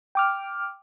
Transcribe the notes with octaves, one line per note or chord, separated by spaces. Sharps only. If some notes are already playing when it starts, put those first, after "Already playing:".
G5 D6 F6